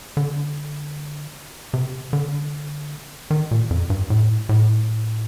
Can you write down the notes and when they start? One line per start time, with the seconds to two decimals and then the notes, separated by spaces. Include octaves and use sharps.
0.17 D3
1.74 C3
2.13 D3
3.30 D#3
3.51 A#2
3.71 F2
3.90 G2
4.10 A2
4.49 A2